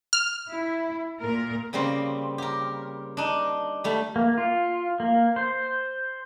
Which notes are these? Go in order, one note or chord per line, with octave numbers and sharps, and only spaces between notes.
F6
E4
A#2 A#4
C#3 G3 A#3 C4
G4 A#4
D4 D#4
G3 A3
A#3
F4
A#3
C5